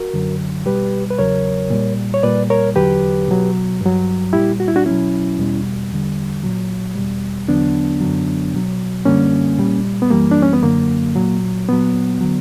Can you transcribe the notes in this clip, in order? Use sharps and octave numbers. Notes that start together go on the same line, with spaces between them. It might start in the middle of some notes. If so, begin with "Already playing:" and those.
Already playing: F#4 A#4
F#2 D3 F#3
B2 G3 G4 B4
B4
E2 C#3 F#3 A#4 C#5
A#2 G3
C#5
A#2 G3 B4 D5
A#4 C#5
E2 D3 F#3 G4 B4
B2 F#3
G2 F#3
A#2 G3 E4 G4
F#4
E4
D4 F#4
B2 F#3 C#4 E4
E2 B2 G3
E2 D3 G3
A#2 F#3
E2 B2 G3
E2 D3 F#3 B3 D4
F#2 D3 F#3
B2 F#3
F#2 D3 G3 A#3 C#4
A#2 G3
B3
F#2 E3 G3 A#3
D4
C#4
B3
F#2 D3 F#3 A#3
A#2 F#3
A#2 F#3 B3
D3 F#3